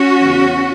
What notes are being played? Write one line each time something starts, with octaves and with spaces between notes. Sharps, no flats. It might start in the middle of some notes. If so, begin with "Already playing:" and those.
Already playing: C#4 F#4
E2 C#3 E3